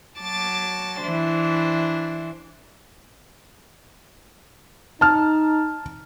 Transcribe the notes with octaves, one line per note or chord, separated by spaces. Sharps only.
F#3 A5 D6 A6
E3 D4 C5
D#4 A5 F6